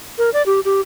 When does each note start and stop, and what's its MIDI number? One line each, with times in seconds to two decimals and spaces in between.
0.18 0.30 70
0.33 0.42 74
0.46 0.60 67
0.65 0.81 67